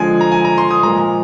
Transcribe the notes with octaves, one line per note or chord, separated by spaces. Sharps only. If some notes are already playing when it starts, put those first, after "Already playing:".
Already playing: D3 F3 G#3 G#5
A#5
G#5
A#5
C6
D#6
A#2 F3 G#3 A#5